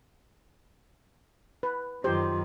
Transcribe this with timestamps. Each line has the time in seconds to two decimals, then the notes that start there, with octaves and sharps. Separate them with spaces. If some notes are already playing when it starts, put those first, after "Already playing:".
1.63 B4
2.04 F#2 D#3 F4 G4 C5